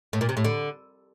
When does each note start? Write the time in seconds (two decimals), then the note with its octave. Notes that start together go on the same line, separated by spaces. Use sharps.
0.13 A2
0.21 A#2
0.29 C3
0.37 A2
0.44 D3